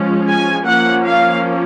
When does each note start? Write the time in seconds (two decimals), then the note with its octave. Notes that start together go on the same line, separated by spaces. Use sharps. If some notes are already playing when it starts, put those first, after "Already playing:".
Already playing: F3 G#3 C#4
0.29 G#5
0.67 F3 A#3 C#4 F#5
1.06 F5